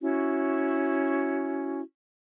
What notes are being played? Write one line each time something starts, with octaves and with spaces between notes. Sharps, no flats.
C#4 E4 F#4